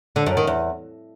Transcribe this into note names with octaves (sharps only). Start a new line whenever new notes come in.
D3
F#2
D#3
E2